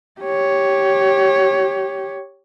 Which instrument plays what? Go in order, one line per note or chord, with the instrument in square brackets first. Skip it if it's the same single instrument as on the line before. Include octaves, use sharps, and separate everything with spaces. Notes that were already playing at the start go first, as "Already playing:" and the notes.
[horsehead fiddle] G4 C#5